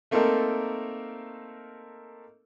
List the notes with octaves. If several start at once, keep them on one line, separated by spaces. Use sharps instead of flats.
A3 A#3 C4 D#4 A4 A#4